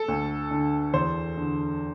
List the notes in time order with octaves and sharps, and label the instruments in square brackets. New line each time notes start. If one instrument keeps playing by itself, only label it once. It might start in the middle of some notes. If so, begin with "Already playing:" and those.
Already playing: [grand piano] A4
D2
D3
E2 C5
D3